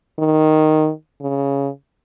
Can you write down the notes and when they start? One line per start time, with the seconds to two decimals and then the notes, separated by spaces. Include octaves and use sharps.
0.19 D#3
1.21 C#3